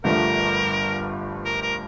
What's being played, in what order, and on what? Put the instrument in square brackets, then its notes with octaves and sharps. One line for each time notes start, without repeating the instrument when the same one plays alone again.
[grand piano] G1 G2 D3 F3 A3 [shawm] A#4
[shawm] A#4
A#4